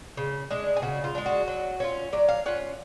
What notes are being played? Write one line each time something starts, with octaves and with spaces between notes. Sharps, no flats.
C#3
G#3 D4
G#4
C#3 F#4
F4
G#3 D4
F#4
F#3
C#4 F4
F#3 D5
F5
C#4 F4 F#5